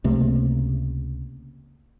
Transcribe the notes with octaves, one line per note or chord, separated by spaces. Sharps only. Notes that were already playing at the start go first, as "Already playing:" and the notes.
C#2 C3 A3 A#3